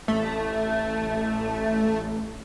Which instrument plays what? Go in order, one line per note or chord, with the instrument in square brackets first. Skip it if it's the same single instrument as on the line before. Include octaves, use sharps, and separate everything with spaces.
[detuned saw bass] A1 [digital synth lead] A3